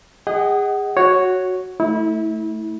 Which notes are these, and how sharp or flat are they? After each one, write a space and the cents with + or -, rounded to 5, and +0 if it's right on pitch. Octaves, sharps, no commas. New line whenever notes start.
G#4 -30 D#5 +0 F#5 +30
F#4 +0 C#5 +0
A3 +0 E4 -30